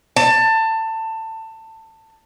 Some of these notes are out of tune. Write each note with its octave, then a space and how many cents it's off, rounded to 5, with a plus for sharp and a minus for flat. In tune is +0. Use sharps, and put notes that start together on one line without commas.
A5 +20